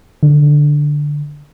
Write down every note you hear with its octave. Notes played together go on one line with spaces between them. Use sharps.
D3